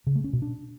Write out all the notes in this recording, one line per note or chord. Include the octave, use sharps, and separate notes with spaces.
C#3
A3
C#4
B2
D4